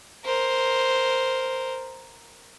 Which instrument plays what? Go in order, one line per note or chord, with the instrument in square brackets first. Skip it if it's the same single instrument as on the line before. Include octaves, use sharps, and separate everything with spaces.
[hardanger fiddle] A#4 C5